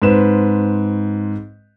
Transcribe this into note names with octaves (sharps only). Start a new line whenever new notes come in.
G#2 C4 B4 E7